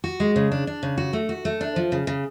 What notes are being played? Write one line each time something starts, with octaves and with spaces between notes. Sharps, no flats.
F#4
G#3
C#3
D4
D4
C#3
F#4
A3
F#4
A3
D4
F3
C#3
C#3